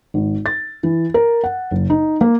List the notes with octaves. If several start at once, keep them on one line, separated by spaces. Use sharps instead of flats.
G#1
A6
E3
A#4
F#5
F#1
D#4
A#3